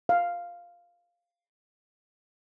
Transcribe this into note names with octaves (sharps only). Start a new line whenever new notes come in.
F5